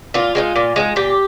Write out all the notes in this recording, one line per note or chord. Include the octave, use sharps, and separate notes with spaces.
A#2 F4
G#3 C4 D#4
A#2
G#3 C4 D#4
A#2 G4